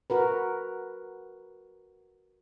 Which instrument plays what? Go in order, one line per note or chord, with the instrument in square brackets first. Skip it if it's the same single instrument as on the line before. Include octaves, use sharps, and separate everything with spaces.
[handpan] F#4 A#4 B4